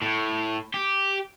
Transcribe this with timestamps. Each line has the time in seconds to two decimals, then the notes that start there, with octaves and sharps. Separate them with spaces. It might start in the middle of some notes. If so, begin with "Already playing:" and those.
0.02 A2
0.74 G4